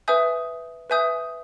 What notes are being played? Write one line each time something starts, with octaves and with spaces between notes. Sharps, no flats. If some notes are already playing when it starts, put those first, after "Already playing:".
B4 E5 G#5 D#6 G6
B4 E5 G#5 D#6 G6